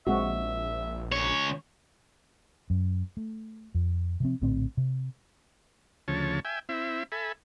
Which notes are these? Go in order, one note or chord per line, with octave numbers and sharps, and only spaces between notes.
A#1 G#3 C4 F#4 E5
C#2 C#5
F#2
A3
F2
C3 F3 C4
A#1 A2 D3 C4
C3
D2 C#3 F3 C#5 A5
E5 G5 G#5
C4 E4 E5
A4 E5 G#5 B5